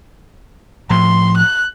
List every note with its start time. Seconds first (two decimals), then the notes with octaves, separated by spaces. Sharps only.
0.90 A2 F3 C6
1.37 F#6